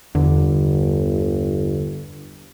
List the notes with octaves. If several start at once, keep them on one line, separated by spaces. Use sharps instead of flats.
G1 E2 D3